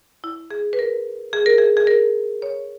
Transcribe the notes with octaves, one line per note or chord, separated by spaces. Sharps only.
E4
G#4
B4
A#4
G#4
A#4
G#4
G#4
A#4
C#5